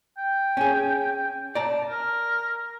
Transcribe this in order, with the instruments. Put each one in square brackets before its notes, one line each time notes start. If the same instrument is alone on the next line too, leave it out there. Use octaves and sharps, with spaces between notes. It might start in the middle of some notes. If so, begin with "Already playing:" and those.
[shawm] G5
[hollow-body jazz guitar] C#4 G#4
[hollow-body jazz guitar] D5 A#5 [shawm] A5
[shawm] A#4